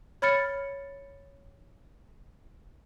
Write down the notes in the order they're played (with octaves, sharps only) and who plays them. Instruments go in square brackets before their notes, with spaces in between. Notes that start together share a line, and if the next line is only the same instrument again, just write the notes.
[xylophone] C#5 B5 F6 A6 C#7